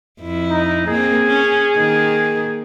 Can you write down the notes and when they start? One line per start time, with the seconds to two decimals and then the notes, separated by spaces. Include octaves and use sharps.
0.21 F2 E4
0.50 D#4
0.87 A#3 C4 G#4
1.27 C#4
1.77 D#3 A#3